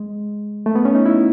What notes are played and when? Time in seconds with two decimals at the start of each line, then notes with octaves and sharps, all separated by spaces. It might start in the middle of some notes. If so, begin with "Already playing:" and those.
Already playing: G#3
0.66 A3
0.75 B3
0.85 C#4
0.95 D#4
1.06 E4